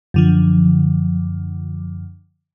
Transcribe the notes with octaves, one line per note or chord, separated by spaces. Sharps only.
F#2 D3 F3